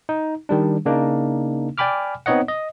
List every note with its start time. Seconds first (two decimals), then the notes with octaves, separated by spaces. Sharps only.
0.09 D#4
0.49 D#3 G3 D4
0.86 C#3 A#3 D4 D#4
1.78 D5 G5 G#5 B5 D6 F6
2.26 B3 C4 D#4 C#5 D#5 F#5
2.48 D#5